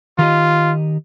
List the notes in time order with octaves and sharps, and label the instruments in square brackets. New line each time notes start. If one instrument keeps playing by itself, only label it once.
[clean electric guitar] D#3 G4 D#5 [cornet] F4